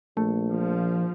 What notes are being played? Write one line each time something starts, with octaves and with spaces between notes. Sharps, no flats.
A#1 A3
F3